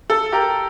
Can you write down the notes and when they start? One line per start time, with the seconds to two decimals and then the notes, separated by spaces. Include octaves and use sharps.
0.10 A4
0.32 G4 A#4